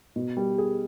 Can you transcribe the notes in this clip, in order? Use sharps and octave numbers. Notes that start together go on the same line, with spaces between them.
B2
G3
G#4